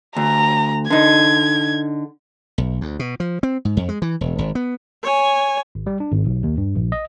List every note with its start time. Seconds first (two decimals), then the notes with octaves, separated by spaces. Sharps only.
0.16 D2 A#5
0.90 D3 D#4 G#6
2.58 B1
2.81 D2
2.99 B2
3.20 F3
3.43 C4
3.65 G#2
3.77 F2
3.89 G#3
4.02 E3
4.21 E1
4.38 G#1
4.55 B3
5.03 C#5 G#5
5.75 G#1
5.87 G3
6.00 D4
6.13 G#1
6.26 B1
6.43 D#2
6.58 G2
6.75 A#1
6.92 D#5